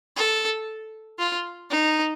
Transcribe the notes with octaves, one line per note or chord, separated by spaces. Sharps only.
A4
F4
D#4